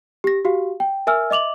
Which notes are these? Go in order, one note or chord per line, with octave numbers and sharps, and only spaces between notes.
G4 A#6
F#4 G4 F5
G5
A#4 E5 G#5 E6 F6
D#5 E5 D6 F7 F#7